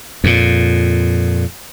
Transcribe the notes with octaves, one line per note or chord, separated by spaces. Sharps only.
F2 A#2